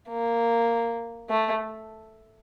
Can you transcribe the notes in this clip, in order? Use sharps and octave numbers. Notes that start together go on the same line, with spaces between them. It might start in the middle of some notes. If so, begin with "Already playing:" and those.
A#3
A3